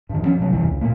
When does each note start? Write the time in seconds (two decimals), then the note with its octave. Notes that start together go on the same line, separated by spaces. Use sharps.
0.09 G2 D#3
0.22 F3 G3 C#4
0.40 C3 F#3
0.53 E2 G2 C3 E3
0.69 C#2
0.81 A#2 A#3